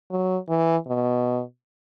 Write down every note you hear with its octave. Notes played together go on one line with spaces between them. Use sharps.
F#3
E3
B2